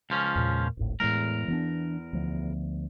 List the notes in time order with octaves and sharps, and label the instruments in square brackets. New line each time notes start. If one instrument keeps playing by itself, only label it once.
[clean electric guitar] C#2 F3 C#4
[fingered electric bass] E2 A#2
D1 G#1 A2
[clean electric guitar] E2 A#4 [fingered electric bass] A2 G#3
[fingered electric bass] E3 B3 D4
D2 F3 B3